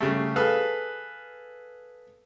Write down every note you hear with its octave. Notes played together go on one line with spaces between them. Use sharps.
C#3 G3 A3
G#4 A4 B4 F5